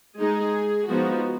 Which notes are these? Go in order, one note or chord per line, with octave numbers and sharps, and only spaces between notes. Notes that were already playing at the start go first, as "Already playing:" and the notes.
G#3 D#4 G#4
F3 G#3 B3 D#4 F#4